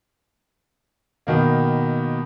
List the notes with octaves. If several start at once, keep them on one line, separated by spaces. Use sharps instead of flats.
B2 D#3 A#3